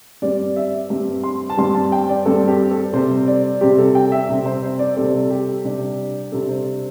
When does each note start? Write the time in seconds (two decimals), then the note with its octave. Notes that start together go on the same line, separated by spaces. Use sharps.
0.22 G2 G3 C4 D5
0.56 E5
0.90 G2 G3 C4
1.24 C6
1.50 A5
1.57 G2 G3 C4 C6
1.75 A5
1.92 G5
2.09 D5
2.26 G2 G3 C4 A4
2.48 G4
2.71 A4
2.93 C3 G3 C4 C5
3.28 D5
3.61 C3 G3 C4 G4
3.78 A4
3.95 G5
4.12 E5
4.29 C3 G3 C4
4.46 C5
4.63 C5
4.79 D5
4.97 C3 G3 C4 A4
5.30 G4
5.64 C3 G3 D4
6.32 C3 G3 D4 A4
6.49 C5